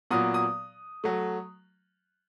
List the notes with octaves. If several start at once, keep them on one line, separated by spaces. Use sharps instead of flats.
A#2 F#3 B3 D#6
D#6
F#3 A3